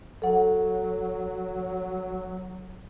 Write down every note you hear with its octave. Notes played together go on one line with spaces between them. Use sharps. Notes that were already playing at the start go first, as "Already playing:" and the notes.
F#3 A4 F#5